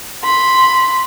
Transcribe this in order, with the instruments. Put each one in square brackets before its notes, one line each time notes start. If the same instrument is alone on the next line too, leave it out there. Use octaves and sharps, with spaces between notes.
[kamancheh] B5 C6